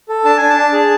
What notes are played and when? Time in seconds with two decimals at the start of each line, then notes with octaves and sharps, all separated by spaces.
0.09 A4
0.25 D4 A5
0.37 D4 G#5
0.50 A5
0.58 D4
0.73 G#4